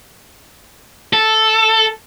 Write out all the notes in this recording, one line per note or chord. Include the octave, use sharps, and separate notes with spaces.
A4